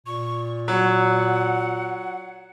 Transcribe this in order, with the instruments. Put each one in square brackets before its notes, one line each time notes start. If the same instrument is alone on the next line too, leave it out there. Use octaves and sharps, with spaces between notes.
[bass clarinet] A#2 [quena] C#6
[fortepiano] F#3 [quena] F#5